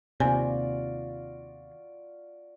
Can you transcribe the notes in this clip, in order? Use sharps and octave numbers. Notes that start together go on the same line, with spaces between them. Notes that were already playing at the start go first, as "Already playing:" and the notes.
D#2 C3 F4 F#4 D5 G#5